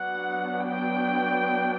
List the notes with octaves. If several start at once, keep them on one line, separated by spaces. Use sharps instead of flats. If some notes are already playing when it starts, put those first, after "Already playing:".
Already playing: F#3 B3 D4 F#5
G5